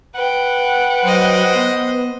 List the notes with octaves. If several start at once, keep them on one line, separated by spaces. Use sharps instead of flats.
B4 F#5 G5
F#3 C5 D#5
B3